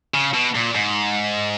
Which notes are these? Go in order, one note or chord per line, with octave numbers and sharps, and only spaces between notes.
C#3
B2
A#2
G#2